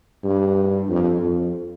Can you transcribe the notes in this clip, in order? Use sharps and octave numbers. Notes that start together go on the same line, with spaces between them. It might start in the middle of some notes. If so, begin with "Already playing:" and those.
G2
F2
F2